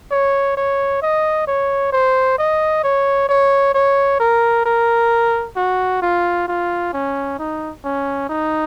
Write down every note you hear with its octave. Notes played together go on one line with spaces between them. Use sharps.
C#5
C#5
D#5
C#5
C5
D#5
C#5
C#5
C#5
A#4
A#4
F#4
F4
F4
C#4
D#4
C#4
D#4